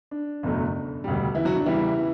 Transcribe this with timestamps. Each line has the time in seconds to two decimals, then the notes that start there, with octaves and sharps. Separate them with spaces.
0.11 D4
0.43 F#1 E2 B2 F#3 A3
1.04 E1 D2 C#3 G3
1.35 E3 E4
1.45 F#3 F#4
1.56 D4
1.65 E2 C#3 E3 G3 E4